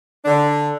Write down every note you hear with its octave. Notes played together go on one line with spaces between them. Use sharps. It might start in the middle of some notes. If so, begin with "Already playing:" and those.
D3 D4